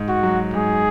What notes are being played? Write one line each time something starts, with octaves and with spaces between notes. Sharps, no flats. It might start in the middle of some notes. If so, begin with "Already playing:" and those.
Already playing: G#2
F#4
F#3
G#2 G#4